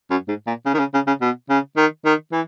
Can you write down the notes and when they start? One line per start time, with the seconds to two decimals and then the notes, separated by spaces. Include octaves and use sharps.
0.11 F#2
0.28 G#2
0.47 A#2
0.66 C#3
0.74 D#3
0.79 C#3
0.94 C#3
1.07 C#3
1.21 B2
1.50 C#3
1.77 D#3
2.05 D#3
2.32 E3